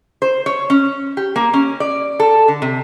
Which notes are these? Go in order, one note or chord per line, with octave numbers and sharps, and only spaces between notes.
C5
C#5
C#4
G4
A#3
C#4
D5
A4
D3
C3